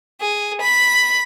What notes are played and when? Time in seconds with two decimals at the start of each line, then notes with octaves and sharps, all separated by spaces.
0.21 G#4
0.61 B5